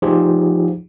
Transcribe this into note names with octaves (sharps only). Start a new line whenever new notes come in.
F3 D#4 F4 G4 G#4